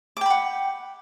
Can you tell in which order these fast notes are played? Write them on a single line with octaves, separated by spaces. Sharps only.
D6 G5 B5 F#5